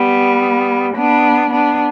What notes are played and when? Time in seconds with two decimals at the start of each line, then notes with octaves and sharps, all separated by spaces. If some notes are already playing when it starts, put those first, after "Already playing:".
Already playing: G3 B3
0.96 B3 D4
1.53 B3 D4